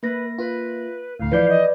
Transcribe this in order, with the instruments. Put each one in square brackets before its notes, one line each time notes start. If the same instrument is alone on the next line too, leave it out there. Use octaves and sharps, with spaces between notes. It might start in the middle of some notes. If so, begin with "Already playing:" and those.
[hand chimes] A#3 A#6 [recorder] B4
[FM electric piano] F4 [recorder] B4
[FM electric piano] D2 A2 [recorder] F5
[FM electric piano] E3 F3 G6 [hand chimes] B4 D5
[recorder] D#5